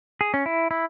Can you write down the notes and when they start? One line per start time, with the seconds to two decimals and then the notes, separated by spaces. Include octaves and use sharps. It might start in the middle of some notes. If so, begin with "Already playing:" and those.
0.21 G#4
0.34 C#4
0.46 E4
0.71 E4